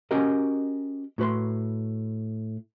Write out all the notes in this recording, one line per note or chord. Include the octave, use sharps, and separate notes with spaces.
C#4 F#4 G4 A#4 D#5
A2 F#4 B4 C6